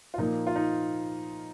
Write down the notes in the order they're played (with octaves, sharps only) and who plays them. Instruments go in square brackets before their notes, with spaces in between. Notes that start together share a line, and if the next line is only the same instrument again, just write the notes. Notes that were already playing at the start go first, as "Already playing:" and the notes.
[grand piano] F4
A#2 F3 A#3 D#4
F4
D#4